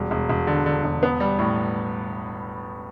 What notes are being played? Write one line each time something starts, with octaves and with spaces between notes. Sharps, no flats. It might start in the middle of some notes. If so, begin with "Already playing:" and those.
Already playing: E1 G3
E1
E1
D3
D3
E1
B3
G3
A2